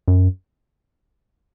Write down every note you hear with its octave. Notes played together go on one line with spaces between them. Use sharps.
F#2